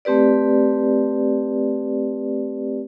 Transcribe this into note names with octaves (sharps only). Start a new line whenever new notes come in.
A3 C4 G4 B4 D5